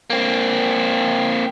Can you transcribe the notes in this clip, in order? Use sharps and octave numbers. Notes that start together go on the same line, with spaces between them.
A#3 C4